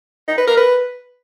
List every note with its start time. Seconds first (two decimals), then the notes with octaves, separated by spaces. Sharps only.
0.28 D#4
0.38 B4
0.47 A#4
0.57 B4